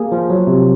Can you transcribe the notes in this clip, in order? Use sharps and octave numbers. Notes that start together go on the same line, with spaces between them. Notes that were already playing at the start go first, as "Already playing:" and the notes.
Already playing: A#3 G#4
F3
F#3
C3